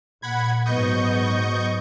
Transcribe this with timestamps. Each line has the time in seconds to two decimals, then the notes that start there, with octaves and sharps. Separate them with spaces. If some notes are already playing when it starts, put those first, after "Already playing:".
0.22 A#2 F#5 B5 G#6
0.66 G#2 F#3 B3 D#5 C#6 G6